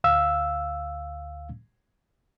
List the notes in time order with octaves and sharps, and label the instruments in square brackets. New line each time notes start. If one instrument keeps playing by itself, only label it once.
[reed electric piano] D2 F5 E6